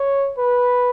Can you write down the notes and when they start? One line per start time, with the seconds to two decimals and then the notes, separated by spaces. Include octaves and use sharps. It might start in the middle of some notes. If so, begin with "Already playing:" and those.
Already playing: C#5
0.37 B4